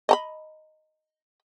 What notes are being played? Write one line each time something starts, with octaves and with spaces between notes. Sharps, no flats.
D#5 A5 B5